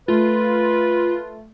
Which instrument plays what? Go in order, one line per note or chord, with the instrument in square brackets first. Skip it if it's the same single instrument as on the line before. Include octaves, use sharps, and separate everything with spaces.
[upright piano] A3 [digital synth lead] F4 [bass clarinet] B4